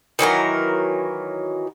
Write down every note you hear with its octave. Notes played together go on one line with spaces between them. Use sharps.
D#3 E3 F#3 A#4